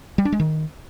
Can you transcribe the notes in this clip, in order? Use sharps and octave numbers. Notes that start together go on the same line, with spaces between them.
G3
D4
G#3
D#3